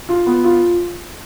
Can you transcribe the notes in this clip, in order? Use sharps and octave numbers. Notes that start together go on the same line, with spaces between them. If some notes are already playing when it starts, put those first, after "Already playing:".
F4
B3
F4